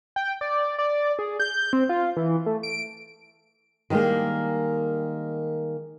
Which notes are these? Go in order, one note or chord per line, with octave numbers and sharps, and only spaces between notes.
G5
D5
D5
G#4
G6
C4
F4
E3
A3
D7
D#3 F3 G3 G#3 A#3